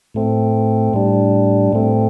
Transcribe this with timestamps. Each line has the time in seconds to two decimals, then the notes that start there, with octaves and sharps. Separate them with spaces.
0.14 A2 A3 C4
0.94 A2 G3 D4
1.73 A2 A3 C4